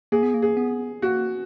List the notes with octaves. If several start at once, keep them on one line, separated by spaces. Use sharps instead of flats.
A#3 G#4
B3
A#3
G#4
B3
A#3 F#4